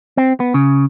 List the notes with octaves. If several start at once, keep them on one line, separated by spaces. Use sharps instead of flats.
C4
B3
C#3